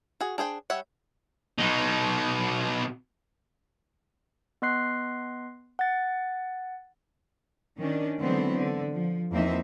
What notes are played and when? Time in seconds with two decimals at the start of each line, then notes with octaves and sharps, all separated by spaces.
0.21 F#4 G#4
0.38 D4 G#4 C5 G5
0.70 G3 C#5 E5 F#5
1.58 B2 D#4
4.62 B3 D#5 C6 F#6 C7
5.79 F#5 A6
7.78 D#3 C#4 D4
8.19 D3 E3 F#3 G#3 B3 C4
8.54 D3
8.92 F3
9.31 E2 F3 A#3 C4 D#4 E5